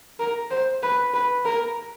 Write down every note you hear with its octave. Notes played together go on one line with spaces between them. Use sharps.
A#4
C5
B4
B4
A#4